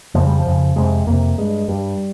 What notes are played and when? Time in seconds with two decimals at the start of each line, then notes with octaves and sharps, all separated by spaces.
0.15 F2 C#3 F3
0.26 G3
0.39 F3
0.46 F2 C#3
0.76 F2 C3 G#3
1.07 F2 C3 A#3
1.38 G2 G#3
1.68 G2 G3